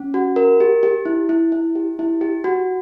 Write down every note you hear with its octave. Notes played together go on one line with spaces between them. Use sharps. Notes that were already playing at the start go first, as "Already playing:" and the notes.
Already playing: C#4
F#4
A#4
G4
G4
E4
E4
E4
G4
E4
G4
F#4